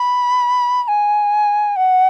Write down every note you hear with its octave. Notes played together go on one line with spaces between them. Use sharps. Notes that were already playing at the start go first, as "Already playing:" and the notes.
Already playing: B5
B5
G#5
F#5